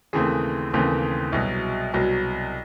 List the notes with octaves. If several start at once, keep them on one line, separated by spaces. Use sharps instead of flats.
D#2 C#3 E3 A3 C4 G#4
D#2 C#3 E3 A3 C4
C2 B2 F#3
C2 B2 F#3